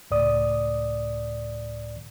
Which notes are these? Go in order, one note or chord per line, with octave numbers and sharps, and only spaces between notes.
C#2 A2 D5 D#6